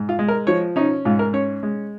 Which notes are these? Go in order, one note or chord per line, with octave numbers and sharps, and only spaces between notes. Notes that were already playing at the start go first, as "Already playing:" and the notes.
Already playing: G#2
F4
G#3
A#4
F3 C#5
C#4 D#4
G#2 F4
A#4
C#4 C#5
G#3